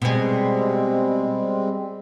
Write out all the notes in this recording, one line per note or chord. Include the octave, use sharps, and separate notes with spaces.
B2 G3 G#3 C4 G#4